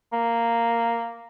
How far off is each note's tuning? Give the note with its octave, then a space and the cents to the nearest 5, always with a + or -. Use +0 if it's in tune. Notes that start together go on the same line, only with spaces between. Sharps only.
A#3 -5